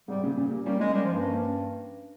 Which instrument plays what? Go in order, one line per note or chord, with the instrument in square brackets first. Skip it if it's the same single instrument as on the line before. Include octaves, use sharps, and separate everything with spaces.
[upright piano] G#2 C3 [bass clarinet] G3
[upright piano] A#2 C#3
A#2 C#3
G3 A#3
[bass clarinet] G3 [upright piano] A#3 C#4
[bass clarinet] G#3 [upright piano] A#3 C#4
[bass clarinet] G3 [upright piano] A#3 C#4
[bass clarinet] F3
G2
[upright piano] A#3 C#4